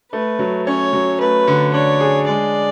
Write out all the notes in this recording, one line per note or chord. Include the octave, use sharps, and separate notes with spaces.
A3 B4
F#3
C#4 C#5
F#3
A3 B4
D3
D4 C#5
G#4
G#3 D5